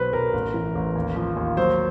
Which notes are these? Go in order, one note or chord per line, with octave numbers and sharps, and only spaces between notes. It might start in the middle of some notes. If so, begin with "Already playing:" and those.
Already playing: B1 F#3 B4 C5
B1 A#4
A1
E3
A1
D#2
F3
D#2
F#3 C5